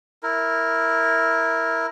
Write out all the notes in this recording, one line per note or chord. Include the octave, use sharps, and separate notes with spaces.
E4 A#4